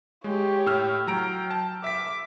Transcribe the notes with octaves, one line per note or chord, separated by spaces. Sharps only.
G#3 G4 C#5
A2 E6 F6
F#3 G5 A#5 D7
A5
E5 D6 B6